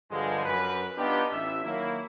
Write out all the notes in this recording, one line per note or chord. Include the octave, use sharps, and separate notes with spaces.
G2 D3 F3 G#3
F#2 B4
B3 D4 D#4 F4 G4
A1 E5
D#3 F#3 A#3 E4